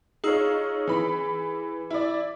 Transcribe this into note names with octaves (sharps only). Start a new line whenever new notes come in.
D#4 F4 G#4 C#5 D#6 E6
E3 B5
E4 D5